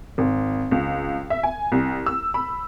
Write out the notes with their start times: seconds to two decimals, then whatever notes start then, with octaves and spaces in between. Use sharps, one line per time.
0.18 G#1
0.71 C#2
1.30 E5
1.43 G#5
1.72 C2
2.06 E6
2.34 B5